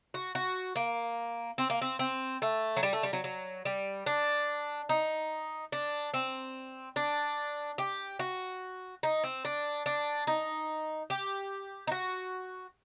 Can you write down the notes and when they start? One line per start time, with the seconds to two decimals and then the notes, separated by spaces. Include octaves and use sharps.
0.14 F#4
0.35 F#4
0.76 A#3
1.58 C4
1.70 A#3
1.82 C4
1.99 C4
2.42 A3
2.76 F#3
2.83 G3
2.93 A3
3.03 G3
3.13 F#3
3.24 F#3
3.65 G3
4.06 D4
4.89 D#4
5.72 D4
6.14 C4
6.96 D4
7.78 G4
8.19 F#4
9.03 D#4
9.24 C4
9.45 D4
9.86 D4
10.27 D#4
11.10 G4
11.87 D#4
11.92 F#4